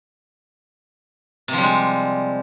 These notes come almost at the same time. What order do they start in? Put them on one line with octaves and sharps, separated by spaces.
C3 F3 G3 G#3